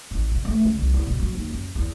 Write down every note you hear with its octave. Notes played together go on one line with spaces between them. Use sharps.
A1
B2
A3
C#2
C2
E2
B2
F#3
D#2
F#2
E2